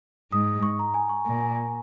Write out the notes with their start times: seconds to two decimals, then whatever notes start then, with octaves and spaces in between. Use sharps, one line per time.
0.32 G#2 D#6
0.63 C#6
0.79 A#5
0.94 G#5
1.09 C#6
1.25 A#2 G#5
1.40 G#5